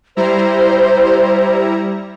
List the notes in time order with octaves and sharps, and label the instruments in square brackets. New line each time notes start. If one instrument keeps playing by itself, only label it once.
[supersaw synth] G3 E4 A#5 [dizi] C5